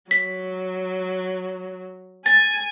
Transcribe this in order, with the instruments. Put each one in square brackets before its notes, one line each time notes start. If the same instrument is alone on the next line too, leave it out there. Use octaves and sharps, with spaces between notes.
[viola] F#3 [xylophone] B6
[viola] G#5 [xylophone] A6